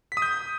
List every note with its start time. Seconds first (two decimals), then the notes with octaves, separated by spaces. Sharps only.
0.12 B6
0.17 D#6
0.22 G6